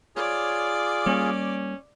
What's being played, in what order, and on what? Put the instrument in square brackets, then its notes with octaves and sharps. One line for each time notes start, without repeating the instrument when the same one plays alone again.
[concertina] F4 G#4 [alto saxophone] C#5 [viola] D5 D6
[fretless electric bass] G3 A#3 [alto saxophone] C#4